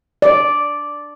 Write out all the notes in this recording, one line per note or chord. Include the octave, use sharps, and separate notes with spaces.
D5